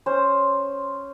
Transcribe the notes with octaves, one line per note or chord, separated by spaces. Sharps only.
C#4 C5